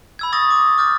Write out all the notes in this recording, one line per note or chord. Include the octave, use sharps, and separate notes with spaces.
B5 E6 G#6
C#6 D#6 E6 A6 A#6
D6 D#6
D6 F6 G6 A6